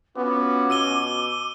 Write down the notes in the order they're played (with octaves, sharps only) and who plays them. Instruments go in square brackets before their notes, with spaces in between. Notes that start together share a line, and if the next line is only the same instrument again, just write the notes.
[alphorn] B3 [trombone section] C#4 F4 F#4 [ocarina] D6
[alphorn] B2 [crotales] E6 D#7 G7